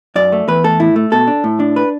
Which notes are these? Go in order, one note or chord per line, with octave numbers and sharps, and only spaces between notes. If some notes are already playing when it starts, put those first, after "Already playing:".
F#2 D5
A3
E2 B4
A3 A4
A2 E4
A3
B2 A4
D4
A2
D4
B4